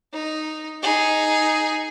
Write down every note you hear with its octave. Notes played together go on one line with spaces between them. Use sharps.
D#4
D#4 G#4